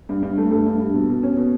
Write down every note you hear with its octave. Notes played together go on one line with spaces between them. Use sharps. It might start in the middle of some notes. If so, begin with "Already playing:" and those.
G2
G2
A3
G2 A4
G2
G2
B2
B2
C#4
B2